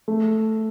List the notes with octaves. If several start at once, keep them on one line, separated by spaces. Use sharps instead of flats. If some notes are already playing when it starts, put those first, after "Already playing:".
A3